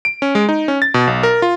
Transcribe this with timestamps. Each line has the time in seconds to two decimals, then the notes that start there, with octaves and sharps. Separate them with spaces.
0.05 D7
0.22 C#4
0.35 G#3
0.49 D#4
0.68 C#4
0.82 A6
0.94 B2
1.07 B1
1.23 A#4
1.42 F4